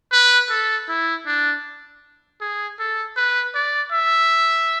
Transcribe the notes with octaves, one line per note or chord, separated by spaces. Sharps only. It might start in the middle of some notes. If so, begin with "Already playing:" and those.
B4
A4
E4
D4
G#4
A4
B4
D5
E5